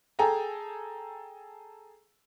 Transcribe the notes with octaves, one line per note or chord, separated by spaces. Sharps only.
G#4 A4 G5 G#5 A#5